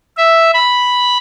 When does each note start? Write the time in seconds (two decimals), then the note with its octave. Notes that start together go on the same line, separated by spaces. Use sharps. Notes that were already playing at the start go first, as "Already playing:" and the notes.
0.18 E5
0.54 B5